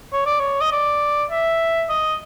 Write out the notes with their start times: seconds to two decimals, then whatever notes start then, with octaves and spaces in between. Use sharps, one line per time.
0.13 C#5
0.26 D5
0.39 C#5
0.61 D#5
0.72 D5
1.30 E5
1.89 D#5